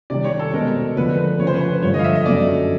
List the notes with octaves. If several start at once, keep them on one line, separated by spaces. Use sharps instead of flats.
C3 D#3 G3 D5
C#5
A4
B2 G#3 C4 A#4
D3 F3 A3 D4 B4
B4
C#3 F3 A3 C#5
C5
B4
C5
G2 D3 F3 A3 C#5
D#5
F5
E5
D#5
F#2 D3 F#3 A3 C#4 D5